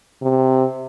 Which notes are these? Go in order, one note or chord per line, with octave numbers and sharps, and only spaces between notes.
C3